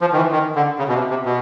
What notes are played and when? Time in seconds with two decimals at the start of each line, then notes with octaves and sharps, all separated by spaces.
0.01 F3
0.13 D#3
0.16 E3
0.32 D#3
0.55 D3
0.79 C#3
0.88 B2
0.94 C3
1.10 C3
1.25 B2